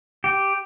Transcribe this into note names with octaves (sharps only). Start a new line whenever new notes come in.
G4